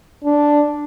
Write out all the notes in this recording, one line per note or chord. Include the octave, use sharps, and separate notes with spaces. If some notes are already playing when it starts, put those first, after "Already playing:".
D4